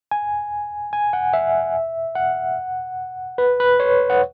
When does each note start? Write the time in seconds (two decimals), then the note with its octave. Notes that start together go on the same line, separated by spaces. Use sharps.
0.11 G#5
0.93 G#5
1.13 F#5
1.33 E5
2.15 F#5
3.38 B4
3.60 B4
3.80 C#5
4.10 F#5